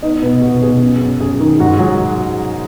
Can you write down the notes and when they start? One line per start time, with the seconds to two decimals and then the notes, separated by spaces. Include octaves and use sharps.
0.02 B3 D#4 D#5
0.22 B2 B3 B4
0.42 B2 F#4
0.62 B2 G#4
0.82 F#2
1.01 F#2
1.20 F#2 G#4
1.40 D#3
1.60 G#2 F#4
1.79 F#3 G#4